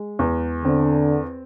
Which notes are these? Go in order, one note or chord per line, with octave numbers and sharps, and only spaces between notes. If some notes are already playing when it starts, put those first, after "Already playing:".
Already playing: G#3
E2
D3 C4